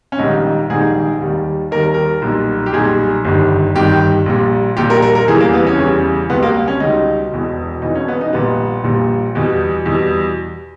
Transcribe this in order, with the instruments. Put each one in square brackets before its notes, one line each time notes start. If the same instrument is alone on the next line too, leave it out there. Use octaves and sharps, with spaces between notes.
[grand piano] C#4
A#1 G#2 D#3 G3 D#4
A#1 G#2 D#3 G3 G#4
D#2 D#3 G3
D#2 D#3 G3 A#4
A#4
B1 A#2 G3
G4
B1 A#2 G3 G#4
G1 G2 D#3 G3
G1 G2 D#3 G3 G4
A#1 A#2 G3
A#1 A#2 G3 G4
A#4
A#4
A#4
E2 C#3 E3 G3 G#4
A#3
B3
C#4
E2 C#3 E3 G3
C#2 B2 G3 B3
A#3
C#4
C#2 B2 G3 D#4
E1 E2 B2
E1 E2 B2 D#4
C#4
B3
D#4
A#1 A#2 G3 B3
A#1 A#2 G3
E2 B2 G3
E2 B2 G3